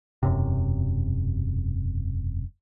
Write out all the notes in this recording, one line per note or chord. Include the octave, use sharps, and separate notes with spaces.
E1 F#2 C3